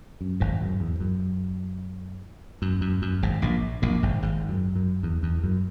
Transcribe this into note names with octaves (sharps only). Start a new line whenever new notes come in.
F#2
G#1 G#2
E2
F#2
E2
F#2
F#2
F#2
F#2
G#1 G#2
A#1 A#2
A#1 A#2
G#1 G#2
G#1 G#2
F#2
F#2
E2
E2
F#2